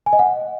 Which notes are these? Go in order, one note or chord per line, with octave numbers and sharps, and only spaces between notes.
G#5
D#5
F#5